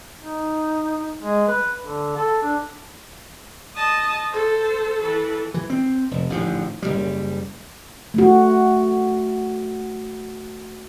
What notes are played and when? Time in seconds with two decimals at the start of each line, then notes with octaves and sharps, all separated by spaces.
0.22 D#4
1.20 G#3
1.48 B4
1.82 D3
2.16 A4
2.42 D4
3.75 D#5 A5
4.33 A4 C5
5.01 E3 A4
5.54 E3
5.70 C4
6.11 F1
6.30 A1 G#2 D3 F3
6.82 F#1 C2 G3
8.14 A3 F#4